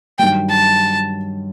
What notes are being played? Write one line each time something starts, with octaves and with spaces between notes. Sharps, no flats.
G2 D#3 F#3 G5
A5